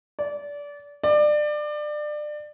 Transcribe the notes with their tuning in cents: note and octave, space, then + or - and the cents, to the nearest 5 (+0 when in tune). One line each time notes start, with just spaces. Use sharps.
D5 -25
D5 +25